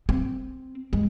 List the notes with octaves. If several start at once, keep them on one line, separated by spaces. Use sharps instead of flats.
C4
G#3